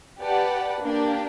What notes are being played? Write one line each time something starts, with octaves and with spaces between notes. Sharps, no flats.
G4 B4 D5 F#5 A5
A#3 D4 G4